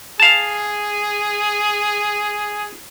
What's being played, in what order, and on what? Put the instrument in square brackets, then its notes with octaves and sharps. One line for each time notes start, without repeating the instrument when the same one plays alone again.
[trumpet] G#4 [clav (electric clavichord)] F5 A5